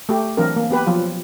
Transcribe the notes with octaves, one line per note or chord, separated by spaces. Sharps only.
A3 G4
E3 F#3 C4 D4 A#4
A#3
B3 G4 B4
F3 F#3 F4